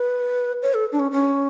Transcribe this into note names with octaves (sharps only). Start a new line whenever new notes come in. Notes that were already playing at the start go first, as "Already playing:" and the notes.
Already playing: B4
C#5
A4
D4
C#4
C#4